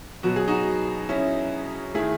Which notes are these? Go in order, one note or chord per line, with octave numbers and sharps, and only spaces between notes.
B2 F#3 B3 F#4
G#4
D#4 F#4
C#4 E4
D#3 A3 E4 G#4